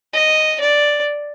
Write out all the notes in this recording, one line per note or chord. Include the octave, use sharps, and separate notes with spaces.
D#5
D5